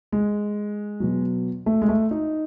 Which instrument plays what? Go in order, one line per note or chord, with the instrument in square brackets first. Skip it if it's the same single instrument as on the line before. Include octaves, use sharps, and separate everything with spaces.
[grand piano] G#3
B2 F#3
A3
G#3
A3
D#4